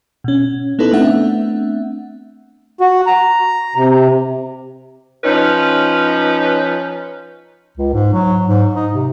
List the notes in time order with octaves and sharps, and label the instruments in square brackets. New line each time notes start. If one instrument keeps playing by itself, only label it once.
[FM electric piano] B2 C#4
B3 D#4 E4 A4 B4
A3 B3 C4 D4 E5 F#5
[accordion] F#4
A#5
C3
[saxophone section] F3 C#4 D#4 B4
[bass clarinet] C#2
G#2
F#3
G#2
D#4
C3